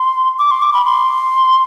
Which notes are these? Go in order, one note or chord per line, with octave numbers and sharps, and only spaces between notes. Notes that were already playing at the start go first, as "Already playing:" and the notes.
Already playing: C6
D6
C6
D6
B5
C6